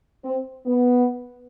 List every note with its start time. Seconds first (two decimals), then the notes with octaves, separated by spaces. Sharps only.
0.23 C4
0.66 B3